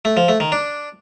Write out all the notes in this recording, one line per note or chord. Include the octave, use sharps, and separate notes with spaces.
A3
F3
A3
D#3
D4